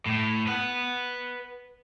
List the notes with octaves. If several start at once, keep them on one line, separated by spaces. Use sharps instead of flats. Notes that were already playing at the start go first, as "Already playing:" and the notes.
A2
B4 F#5